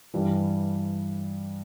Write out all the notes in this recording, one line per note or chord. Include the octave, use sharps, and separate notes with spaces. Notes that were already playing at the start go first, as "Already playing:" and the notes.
G2 E3 G3